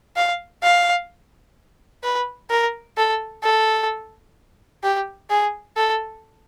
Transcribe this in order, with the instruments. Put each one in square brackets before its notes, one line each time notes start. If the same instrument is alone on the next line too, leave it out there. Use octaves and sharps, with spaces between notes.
[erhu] F5
F5
B4
A#4
A4
A4
G4
G#4
A4